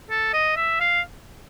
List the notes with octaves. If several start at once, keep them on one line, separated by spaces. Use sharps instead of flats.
A4
D#5
E5
F5